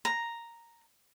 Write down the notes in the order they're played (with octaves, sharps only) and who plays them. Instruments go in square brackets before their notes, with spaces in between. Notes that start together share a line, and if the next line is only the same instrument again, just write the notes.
[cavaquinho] A#5